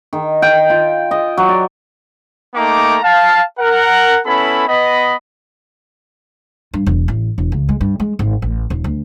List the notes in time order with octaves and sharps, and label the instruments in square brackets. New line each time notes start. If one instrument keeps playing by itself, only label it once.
[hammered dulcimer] D#3
G5
F4
D#5
F#3
D5
[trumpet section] A3 A#3 D#4 G5 A#5 D6
F5 A5
A#4 F#5
B3 C#4 E4 A4 B5
B3 D#5 B5
[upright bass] G2
E1
A1
E1
C#2
G#3
G2
G#3
G#1
A1
D#1
D2